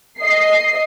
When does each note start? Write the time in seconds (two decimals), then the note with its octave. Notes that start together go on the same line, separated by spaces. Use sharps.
0.20 D#5 C7